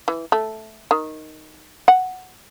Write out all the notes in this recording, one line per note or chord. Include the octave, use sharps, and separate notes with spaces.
E3
A3
D#3
F#5